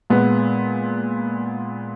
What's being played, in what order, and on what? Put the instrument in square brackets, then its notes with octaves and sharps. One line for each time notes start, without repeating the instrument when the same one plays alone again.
[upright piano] A#2 G#3 B3